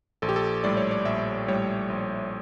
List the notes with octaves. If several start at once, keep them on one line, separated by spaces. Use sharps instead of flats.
A#1 A4
G4
A4
A2 G3 D5
C#5
D5
A#1 E5
A2 G3 C#5
A#1